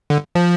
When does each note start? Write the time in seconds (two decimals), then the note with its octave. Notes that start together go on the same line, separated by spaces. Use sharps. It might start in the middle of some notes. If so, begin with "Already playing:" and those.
0.10 D3
0.35 F3